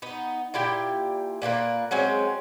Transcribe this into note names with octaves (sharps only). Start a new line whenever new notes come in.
B3 D#4
A#2 E4 G4 G5
A#2 A#3 A#4 B4
F#3 G#3 C4 C#4